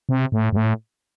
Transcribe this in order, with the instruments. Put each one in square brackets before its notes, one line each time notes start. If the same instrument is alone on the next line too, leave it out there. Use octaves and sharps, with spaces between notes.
[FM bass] C3
A2
G2
A2